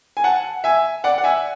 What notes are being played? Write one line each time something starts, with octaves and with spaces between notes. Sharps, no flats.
G#5
F#5 A5
E5 G#5
D5 F#5
F#5
E5 G#5